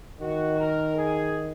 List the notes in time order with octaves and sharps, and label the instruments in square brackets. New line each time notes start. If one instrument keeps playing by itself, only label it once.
[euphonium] D#3 [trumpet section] F#4
[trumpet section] A#4
G#4